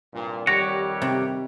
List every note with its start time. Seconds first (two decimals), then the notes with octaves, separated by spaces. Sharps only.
0.13 C2 G2 A#2
0.47 F2 D#3 G3 G4 C#5 F#5 A#6
1.02 C3